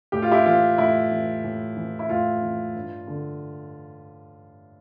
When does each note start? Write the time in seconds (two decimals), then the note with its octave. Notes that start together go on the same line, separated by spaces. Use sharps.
0.12 A2 G4
0.22 F4
0.31 E4 G4
0.46 E3 F4
0.78 A2 E4
1.11 E3
1.44 A2
1.77 E3
1.99 E4
2.09 A2 F4
2.42 E3
2.75 G2
3.07 D3